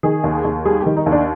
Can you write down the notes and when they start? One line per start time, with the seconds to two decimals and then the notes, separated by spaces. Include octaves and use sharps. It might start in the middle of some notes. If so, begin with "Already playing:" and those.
0.03 D#3 G#4
0.24 D#2
0.44 D#2
0.65 G3 G#4
0.81 G4
0.86 D#3
0.96 D#4
1.06 D#2
1.12 D4